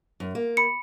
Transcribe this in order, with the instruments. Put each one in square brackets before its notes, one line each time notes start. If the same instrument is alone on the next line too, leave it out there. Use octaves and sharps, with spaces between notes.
[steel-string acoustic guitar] F#2
A#3
[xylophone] B5 C#7